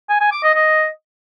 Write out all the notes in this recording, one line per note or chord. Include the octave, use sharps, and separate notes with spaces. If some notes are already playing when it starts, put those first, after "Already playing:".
G#5
G#5
D6
D#5
D#5